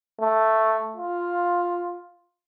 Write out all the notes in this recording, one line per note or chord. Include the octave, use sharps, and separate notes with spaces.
A3
F4